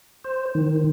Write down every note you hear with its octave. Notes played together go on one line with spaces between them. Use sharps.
C5
D#3